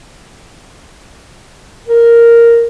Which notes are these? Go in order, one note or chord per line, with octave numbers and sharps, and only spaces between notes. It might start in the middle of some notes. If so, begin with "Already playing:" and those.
A#4